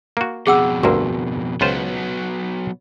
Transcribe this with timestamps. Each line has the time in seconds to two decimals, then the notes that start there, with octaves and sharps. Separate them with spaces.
0.17 A#3 F#4
0.47 F2 B2 G#4 F#5 E6
0.83 D2 G2 A#3 F#4 A#4
1.61 C#2 F#3 B3 F4 C5